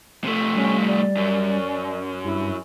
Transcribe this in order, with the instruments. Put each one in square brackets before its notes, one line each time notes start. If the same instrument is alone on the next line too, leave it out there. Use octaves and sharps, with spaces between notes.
[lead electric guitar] C3 A3
[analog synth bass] G3 [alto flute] C#4
[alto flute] D5
[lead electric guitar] F#2
[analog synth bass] G2 [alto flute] E4